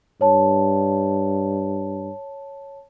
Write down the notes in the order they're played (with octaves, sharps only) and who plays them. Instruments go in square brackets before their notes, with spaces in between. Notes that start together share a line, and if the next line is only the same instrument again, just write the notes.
[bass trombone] G2 [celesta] C#5 A5